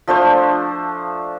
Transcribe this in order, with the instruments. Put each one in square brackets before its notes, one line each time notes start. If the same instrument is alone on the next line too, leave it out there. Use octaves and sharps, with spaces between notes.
[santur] F3 A3 D4 C5